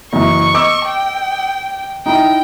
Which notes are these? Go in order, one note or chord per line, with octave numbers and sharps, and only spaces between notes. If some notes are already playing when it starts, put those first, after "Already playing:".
F#1 E3 C#6
D#5 D6 E6
G5
D#4 E4 G5